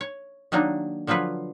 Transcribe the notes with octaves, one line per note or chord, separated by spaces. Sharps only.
C#5
D#3 F#3 A#3 D4 D#4
D3 F3 F#3 F4 B4 C#5